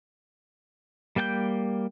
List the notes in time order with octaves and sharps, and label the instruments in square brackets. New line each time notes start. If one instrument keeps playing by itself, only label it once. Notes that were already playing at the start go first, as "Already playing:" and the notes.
[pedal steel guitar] G3 A#3 G5 G#5 G6